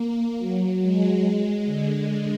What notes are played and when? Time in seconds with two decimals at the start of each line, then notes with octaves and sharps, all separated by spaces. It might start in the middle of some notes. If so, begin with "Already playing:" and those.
Already playing: A#3
0.38 F#3
0.81 G#3
1.65 D3